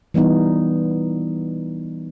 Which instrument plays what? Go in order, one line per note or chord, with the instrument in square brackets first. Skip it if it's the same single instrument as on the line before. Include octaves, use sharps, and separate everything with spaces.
[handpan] E3 G3 B3 D#4